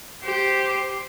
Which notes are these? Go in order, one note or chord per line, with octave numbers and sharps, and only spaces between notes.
G4 C5